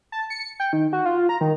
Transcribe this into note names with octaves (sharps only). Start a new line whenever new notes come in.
A5
C#7
G5
D#3
F#4
F4
A#5
D#3